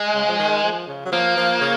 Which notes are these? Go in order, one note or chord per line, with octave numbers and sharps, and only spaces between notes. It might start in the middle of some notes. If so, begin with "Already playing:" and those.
Already playing: G#3
C#3
F3
D#3
F3
C#3
F#3
F3 A#3
F3
C#3